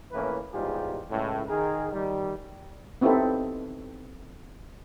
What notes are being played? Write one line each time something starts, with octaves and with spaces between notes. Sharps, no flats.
F2 A2 E3 A#3 C#4 B4
E2 G#2 G3 F4 G4 G#4
C#2 A2
D#3 G#4 A#4
D#3 G3
B3 C4 D#4 E4 G4 A4